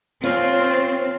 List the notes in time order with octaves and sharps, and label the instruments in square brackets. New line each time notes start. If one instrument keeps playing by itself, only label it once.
[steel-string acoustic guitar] D#2 C#4 [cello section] C4 [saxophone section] F4